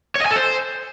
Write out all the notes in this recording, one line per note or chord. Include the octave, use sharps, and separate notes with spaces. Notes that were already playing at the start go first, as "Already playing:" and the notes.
C#5
D#5
G#5
A4
C5